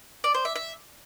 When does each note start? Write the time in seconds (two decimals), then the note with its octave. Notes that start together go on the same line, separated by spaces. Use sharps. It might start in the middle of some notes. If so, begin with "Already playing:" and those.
0.24 D5
0.34 C5
0.45 E5
0.56 E5